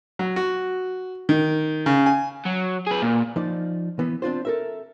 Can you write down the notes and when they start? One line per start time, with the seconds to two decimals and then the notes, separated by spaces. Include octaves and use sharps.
0.19 F#3
0.36 F#4
1.29 D#3
1.86 C#3
2.06 G#5
2.46 F#3
2.87 G#4 B4
3.02 A#2
3.36 F3 D#4 D5
3.99 E3 B3
4.22 C4 D4 F4 C5
4.45 A4 A#4 E5